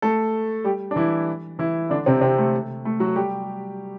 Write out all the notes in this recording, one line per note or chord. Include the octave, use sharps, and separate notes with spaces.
A3 A4
G3 G4
D4
E3 E4
E3 E4
D3 D4
C3 C4
C3 C4
A3
A3
F#3 F#4
G3 G4